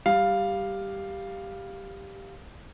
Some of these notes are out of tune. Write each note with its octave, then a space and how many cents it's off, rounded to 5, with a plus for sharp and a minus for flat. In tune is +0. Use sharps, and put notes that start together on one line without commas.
G3 +0 F5 +0